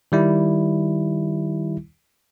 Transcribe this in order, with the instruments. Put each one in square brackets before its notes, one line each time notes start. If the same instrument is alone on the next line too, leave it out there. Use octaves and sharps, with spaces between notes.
[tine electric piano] D#3 G3 E4